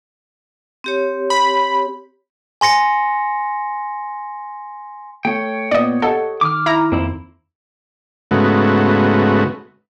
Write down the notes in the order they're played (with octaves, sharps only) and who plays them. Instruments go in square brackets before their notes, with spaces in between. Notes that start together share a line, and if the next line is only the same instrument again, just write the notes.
[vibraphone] C4 G4 C#5
[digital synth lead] B5
[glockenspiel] G#5 C6 A#6 C#7
[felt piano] A3 [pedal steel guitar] C#5 G5
[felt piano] A#2 B3 [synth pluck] D5 D#5
[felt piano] G4 D#5 F#5 [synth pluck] A4
[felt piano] D#3 [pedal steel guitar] D6 F6
[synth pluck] E4 A#5
[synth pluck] F2 [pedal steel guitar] A#3 C4 E4
[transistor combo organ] G#2 C#3 A3 B3 F#4